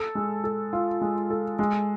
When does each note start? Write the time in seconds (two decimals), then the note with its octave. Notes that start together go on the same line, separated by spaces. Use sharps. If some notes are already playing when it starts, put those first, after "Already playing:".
Already playing: A4
0.15 G#3
0.44 A4
0.73 F4
1.02 G#3
1.30 A4
1.59 G#3